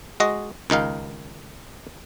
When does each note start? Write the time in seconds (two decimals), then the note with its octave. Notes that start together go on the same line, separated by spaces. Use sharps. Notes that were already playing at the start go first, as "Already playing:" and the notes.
0.20 G#3 F#4 D#5
0.70 C#2 D#3 D#4 F5